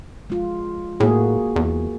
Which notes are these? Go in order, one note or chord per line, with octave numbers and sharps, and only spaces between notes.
G#3 F4
A2 A#3 F#4 G#4
E2